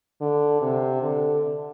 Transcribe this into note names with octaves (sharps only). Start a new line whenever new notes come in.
D3
C3
D3